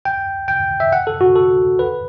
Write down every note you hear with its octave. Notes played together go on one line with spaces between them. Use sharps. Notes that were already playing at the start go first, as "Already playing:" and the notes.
G5
G5
E5
F#5
A4
F#4
A4
B4